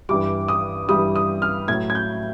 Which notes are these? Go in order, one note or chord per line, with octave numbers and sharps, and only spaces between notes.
G2 E3 G3 D6
D#6
G2 E3 G3 D#6
D#6
F6
A2 F#3 G#6
G#6
G6